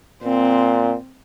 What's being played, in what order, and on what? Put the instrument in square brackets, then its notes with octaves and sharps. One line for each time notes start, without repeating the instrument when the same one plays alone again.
[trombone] A#2 [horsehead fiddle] C4